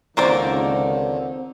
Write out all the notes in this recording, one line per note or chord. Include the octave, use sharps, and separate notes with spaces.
C#2 D3 D#3 A#3 C4 D#4 C5 D5